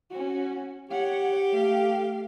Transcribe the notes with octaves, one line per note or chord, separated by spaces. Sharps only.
C#4 F#4
G4 C#5 F#5
A3 F5